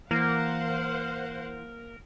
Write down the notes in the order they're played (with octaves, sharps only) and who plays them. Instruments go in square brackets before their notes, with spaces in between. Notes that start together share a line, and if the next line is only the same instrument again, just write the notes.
[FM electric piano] E3 [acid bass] A#3 [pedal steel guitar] A#4 [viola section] C5 F5 F#5